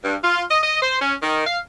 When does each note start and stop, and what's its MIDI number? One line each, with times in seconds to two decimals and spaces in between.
0.04 0.17 43
0.24 0.42 65
0.51 0.59 75
0.63 0.80 75
0.82 1.00 72
1.01 1.15 61
1.22 1.46 51
1.47 1.59 77